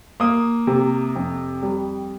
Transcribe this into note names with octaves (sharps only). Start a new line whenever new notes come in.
A#3 D#6
C3
F2
G3